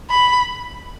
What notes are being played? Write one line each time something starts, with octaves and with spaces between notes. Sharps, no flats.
B5